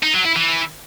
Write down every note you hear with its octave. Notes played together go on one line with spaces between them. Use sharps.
D#4
F#3
E4
E3